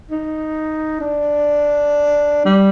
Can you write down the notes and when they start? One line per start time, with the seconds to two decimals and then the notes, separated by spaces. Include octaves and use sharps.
0.11 D#4
1.01 D4
2.45 G3